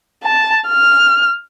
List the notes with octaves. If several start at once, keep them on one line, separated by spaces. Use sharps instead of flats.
A5
F6